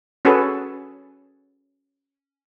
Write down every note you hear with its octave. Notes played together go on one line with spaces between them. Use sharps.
C#4 F#4 G#4 A4 B4